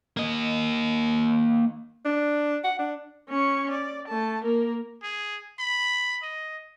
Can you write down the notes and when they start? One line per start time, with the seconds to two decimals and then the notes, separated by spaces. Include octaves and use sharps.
0.17 A#3 D#5
2.05 D4
2.64 F#5
2.79 D4
3.29 C#4 C#6
3.71 D5
4.08 A3 A5
4.45 A#3 A#4
5.03 G#4
5.59 B5
6.23 D#5